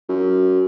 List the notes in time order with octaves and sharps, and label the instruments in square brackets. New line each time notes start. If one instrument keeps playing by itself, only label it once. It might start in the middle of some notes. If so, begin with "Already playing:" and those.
[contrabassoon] F#2